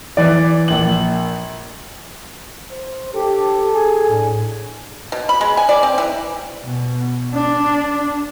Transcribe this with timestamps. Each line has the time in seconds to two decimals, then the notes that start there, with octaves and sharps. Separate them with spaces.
0.17 E3 D5
0.68 A#1 F#7
2.71 C5
3.14 D4 G4 A4
3.74 G#4 G#5
4.10 A2 D4
5.12 B2
5.29 B5
5.41 G#3
5.57 G#5
5.69 D5
5.83 C4
5.98 E3
6.63 B2
7.34 D4